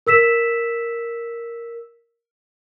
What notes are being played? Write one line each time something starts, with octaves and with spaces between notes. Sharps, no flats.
A#4 E6 B6 E7